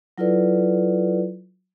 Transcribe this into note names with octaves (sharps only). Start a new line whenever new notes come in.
F#3 E4 F4 A4 B4 D5